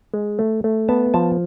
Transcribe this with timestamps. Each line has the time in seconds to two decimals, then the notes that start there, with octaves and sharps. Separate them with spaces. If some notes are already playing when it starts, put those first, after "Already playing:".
0.14 G#3
0.39 A3
0.64 A3
0.89 B3 A5
1.14 F3 A5